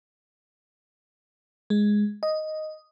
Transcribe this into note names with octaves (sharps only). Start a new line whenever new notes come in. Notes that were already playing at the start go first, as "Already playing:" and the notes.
G#3
D#5